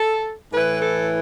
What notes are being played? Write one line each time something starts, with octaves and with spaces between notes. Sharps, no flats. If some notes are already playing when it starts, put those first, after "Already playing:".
Already playing: A4
A2 E3 B4
A4